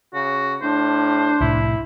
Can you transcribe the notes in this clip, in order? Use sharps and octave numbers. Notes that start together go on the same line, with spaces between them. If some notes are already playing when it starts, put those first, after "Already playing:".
C#3 F#4
A2 D4 C5
C2 A2 E4